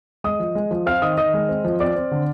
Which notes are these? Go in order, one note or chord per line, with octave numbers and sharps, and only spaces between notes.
G#3 D#5 D#6
F3
G#3
F3
C4 F5 F6
D#3 D#5 D#6
D#3 D#5 D#6
G#3
C4
F3
C4 D5 D6
C4
D3